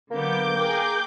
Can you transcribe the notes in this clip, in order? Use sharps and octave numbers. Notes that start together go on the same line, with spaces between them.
D3 F#3 A#3 B3 D6 G6
G#4 A#4 G5